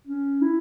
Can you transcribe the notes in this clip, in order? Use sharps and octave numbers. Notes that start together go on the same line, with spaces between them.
C#4
E4